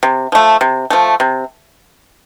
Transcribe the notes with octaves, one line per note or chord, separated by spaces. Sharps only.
C3
F3 A3
C3
F3 A3
C3